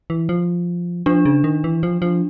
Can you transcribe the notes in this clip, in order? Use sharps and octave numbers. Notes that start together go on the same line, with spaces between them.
E3
F3
F3 D4
C#3
D#3
E3
F3
F3